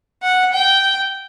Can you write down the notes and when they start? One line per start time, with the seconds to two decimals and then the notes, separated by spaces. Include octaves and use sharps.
0.22 F#5
0.53 G5